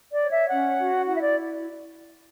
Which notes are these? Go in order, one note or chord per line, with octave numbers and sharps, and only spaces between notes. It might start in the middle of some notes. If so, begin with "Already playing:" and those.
D5
C#5
E5
C#4 F#5
F#4
E4 F#5
E5
D5